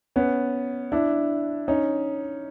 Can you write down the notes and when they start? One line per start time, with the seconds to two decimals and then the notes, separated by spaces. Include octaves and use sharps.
0.16 B3 C#4
0.92 D4 E4
1.68 C#4 D#4